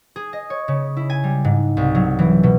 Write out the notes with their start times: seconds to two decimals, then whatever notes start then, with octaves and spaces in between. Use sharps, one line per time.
0.16 G#4
0.33 D#5
0.50 C#5
0.68 C#3
0.97 E4
1.10 G#5
1.24 G3
1.44 G#2
1.77 C2
1.95 F#3
2.19 E3
2.43 B2